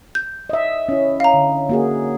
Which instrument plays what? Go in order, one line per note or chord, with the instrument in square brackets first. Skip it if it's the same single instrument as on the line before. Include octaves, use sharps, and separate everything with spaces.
[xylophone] G6
[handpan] D#5 E5
C#4 E4
[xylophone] F5 A#5
[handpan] D3
A#3 F#4 G#4